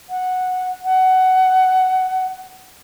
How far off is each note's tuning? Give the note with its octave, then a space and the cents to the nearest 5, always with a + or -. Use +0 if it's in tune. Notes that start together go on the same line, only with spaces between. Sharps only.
F#5 -5
F#5 +15